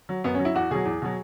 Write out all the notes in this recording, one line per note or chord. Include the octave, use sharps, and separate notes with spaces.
F#3
F#2 B3
C#4
F#3
E4
E2 F#4
B2 F#3 G#4
E2
B2 F#3